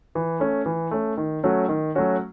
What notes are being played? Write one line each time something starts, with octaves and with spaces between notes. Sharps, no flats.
E3
A3 C#4
E3
A3 C#4
D#3
F#3 A3 C#4 F#4
D#3
F#3 A3 C#4 F#4